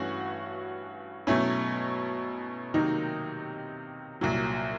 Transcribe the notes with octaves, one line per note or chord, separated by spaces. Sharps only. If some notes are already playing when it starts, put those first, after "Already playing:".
Already playing: G2 E3 A3 C#4 F#4
B2 F#3 A3 C#4 E4
C3 D#3 F#3 A#3 D#4
C2 A#2 F#3